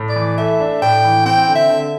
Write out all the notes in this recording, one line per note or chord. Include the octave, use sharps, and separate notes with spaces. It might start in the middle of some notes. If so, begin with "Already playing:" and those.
Already playing: A2
D5
E3
A3 E5
D4
A2 G5
E3
C4 G5
D3
E5
D3